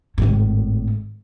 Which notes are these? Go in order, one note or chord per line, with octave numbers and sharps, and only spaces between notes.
G#1 A2